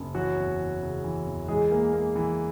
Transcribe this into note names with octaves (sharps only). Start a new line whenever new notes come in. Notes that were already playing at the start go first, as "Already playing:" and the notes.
Already playing: F#1
E3 F#3 F#4
E2
E3
C#3
E3
E2
E3 G#3 G#4
A#3
A#3
E3